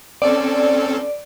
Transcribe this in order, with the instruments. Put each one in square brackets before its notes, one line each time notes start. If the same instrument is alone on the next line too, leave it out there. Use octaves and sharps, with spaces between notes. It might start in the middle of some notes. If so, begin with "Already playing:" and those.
[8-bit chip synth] C4 C#4 A4 [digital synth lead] D5